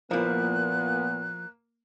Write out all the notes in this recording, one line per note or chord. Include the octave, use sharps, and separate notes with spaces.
A#2 F3 A#3 B3 E4 F#6